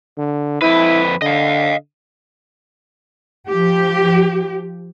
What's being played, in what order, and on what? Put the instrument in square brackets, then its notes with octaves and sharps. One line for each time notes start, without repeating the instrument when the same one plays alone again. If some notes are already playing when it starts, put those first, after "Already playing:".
[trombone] D3
[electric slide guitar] F2 B4 [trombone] E4
[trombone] D3 [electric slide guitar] D#5 F5
[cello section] F3 G4